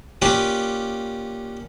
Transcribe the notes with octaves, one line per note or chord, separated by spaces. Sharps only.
A#3 C#4 F4 G4 B4 D5